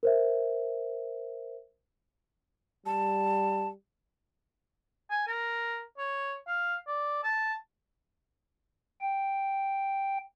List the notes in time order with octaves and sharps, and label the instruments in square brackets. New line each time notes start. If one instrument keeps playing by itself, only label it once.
[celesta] A#4 C5 E5
[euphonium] G3 [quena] A5
[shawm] G#5
A#4
C#5
F5
D5
A5
[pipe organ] G5